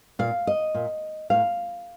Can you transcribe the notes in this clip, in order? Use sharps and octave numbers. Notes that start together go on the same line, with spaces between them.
A#2 F5
D#5
A#2
A2 F5